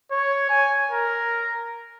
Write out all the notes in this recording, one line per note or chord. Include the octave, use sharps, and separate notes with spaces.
C#5
G#5
A#4